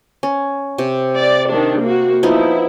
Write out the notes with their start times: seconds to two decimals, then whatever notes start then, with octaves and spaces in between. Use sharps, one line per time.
0.23 C#4
0.78 C3
1.18 D5
1.50 D#3 D4
1.83 A#3 F#4
2.23 F3 B3 D#4 E4